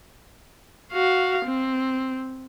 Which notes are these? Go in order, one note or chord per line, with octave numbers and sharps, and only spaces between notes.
F#4 F5
C4